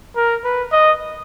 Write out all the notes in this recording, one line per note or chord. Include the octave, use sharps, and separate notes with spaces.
A#4
B4
D#5